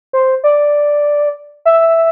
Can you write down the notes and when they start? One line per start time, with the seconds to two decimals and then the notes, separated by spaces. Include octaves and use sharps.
0.13 C5
0.44 D5
1.65 E5